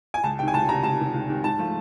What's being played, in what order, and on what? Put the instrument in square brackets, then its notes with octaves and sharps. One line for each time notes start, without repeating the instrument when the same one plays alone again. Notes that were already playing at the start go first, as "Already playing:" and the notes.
[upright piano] G#5
C#2 A5
C3 D#3 G5
G#5
C#2 A5
C3 D#3 A#5
C#2 A5
C3 D#3
C#2
C3 D#3
G#2 A5
F3 A3